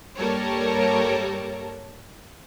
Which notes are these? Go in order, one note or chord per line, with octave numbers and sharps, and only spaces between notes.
G2 G3 A#3 A4 A#4 C#5